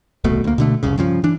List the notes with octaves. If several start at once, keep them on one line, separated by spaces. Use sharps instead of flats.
D#1 C2 B2 A3
D2 A#3
B2 D3 A3
F1 C2 C#3
G2 C#3 F3
E3 D4